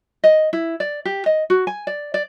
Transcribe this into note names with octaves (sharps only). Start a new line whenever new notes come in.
D#5
E4
D5
G4
D#5
F#4
G#5
D5
D5